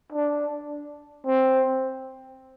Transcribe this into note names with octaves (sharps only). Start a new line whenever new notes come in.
D4
C4